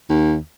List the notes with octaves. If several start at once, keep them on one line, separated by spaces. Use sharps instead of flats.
D#2